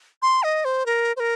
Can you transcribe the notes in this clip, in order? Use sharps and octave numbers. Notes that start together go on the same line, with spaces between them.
C6
D#5
C5
A#4
C5
A#4